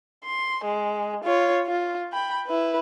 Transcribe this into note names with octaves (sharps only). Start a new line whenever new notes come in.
C6
G#3
F4 C#5
F4
G5 B5
E4 B4